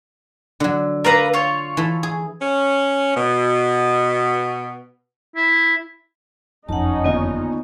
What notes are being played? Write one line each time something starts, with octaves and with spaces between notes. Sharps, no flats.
D3 F#3
A#4 B4 D5 E5 F5 A#5
F4 C#5
E3 A4
G#4
C#4
B2
E4
F#1 F2 C#4 D#4 F#5 A5
D#2 D3 B3 F4 D#5